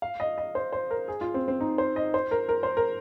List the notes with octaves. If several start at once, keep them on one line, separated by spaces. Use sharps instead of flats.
F5
D#5
D#5
C5
C5
A#4
G#4
F4
C4
C4
D#4
C5
D#5
C5
A#4
A#4
C5
A#4